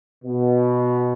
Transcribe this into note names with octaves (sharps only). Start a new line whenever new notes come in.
B2